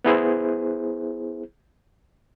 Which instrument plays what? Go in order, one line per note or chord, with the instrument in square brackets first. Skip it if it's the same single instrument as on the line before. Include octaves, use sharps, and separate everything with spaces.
[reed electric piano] B3 E4 G#4 C5